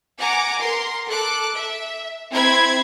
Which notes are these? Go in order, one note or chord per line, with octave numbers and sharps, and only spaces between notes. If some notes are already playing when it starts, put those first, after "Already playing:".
F#5 G#5 A#5 D6
A#4 C6
A4 D6 F#6
E5
C4 E4 C5 B5 G#6